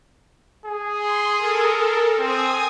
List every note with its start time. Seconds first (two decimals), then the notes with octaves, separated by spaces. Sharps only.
0.66 G#4
0.97 C6
1.36 A4 A#4
2.19 C4 G#5 D#6 G#6